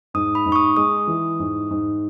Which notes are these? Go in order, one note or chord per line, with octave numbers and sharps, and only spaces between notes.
G#2 D#6
B5
G#2
C#6
D#6
G#3 D#6
E3
G#2
G#2